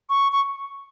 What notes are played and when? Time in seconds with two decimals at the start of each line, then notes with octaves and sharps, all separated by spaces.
0.10 C#6
0.32 C#6